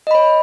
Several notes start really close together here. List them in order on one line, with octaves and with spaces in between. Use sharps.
D#5 B5 C#5